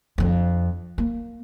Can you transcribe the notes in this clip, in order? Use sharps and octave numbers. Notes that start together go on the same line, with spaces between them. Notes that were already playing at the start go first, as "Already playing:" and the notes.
F2 D4
A#3